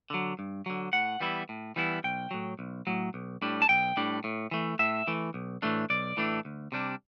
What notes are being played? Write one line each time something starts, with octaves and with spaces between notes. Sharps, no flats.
D3 F#3
G2
D3 F#3
A2 F#5
E3 G3 B3 E4
A2
E3 G3 B3 E4
B1 G5
A2 F#3
B1
A2 F#3
B1
A2 G3 D4
A5
B1 G5
A2 G3 D4
A2
E3 A3
A2 E5
E3 A3
B1
A2 E3 A3 D4
B1 D5
A2 E3 A3 D4
D2
C3 G3 D4